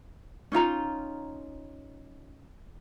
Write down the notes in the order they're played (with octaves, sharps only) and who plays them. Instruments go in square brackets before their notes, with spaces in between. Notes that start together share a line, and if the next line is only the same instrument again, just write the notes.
[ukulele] C#4 D#4 F4 A#5